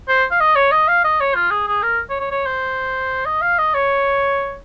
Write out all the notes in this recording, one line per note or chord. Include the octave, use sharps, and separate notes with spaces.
C5
F5
D#5
C#5
D#5
F5
D#5
C#5
F4
G#4
G#4
A#4
C#5
C#5
C#5
C5
D#5
F5
D#5
C#5